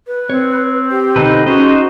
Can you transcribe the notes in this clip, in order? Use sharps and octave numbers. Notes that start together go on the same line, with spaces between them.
B4
C4 C#5
G4
B1 D3 D#4 A4 B4 C5
C#4 D#4 F#4 G#4 C5 D#5